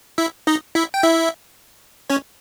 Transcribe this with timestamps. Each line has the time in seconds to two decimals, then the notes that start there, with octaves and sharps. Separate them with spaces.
0.18 E4 E5
0.47 D#4 D#5
0.75 E4 E5
0.94 G5
1.03 E4 E5
2.10 C#4 C#5